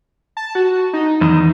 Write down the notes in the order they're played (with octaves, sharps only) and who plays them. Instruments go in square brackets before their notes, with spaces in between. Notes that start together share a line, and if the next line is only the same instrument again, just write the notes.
[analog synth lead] A5
F#4
D#4
[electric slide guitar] E2 D#3 [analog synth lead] D#4